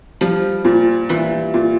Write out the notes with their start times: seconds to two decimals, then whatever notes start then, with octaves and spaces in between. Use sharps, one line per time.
0.21 F3 G3
0.65 A#2
1.09 A#2 E3
1.54 A#2